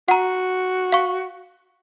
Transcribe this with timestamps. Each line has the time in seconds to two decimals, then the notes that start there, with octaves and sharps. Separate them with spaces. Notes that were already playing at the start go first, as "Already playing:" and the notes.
0.08 F#4 F#5 A#5
0.92 F5 C#6